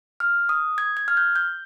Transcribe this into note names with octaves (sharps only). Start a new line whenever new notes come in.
F6
D#6
G#6
G#6
F6
G6
G6